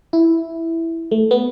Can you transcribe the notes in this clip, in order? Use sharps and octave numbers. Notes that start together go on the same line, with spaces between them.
E4
A3
B3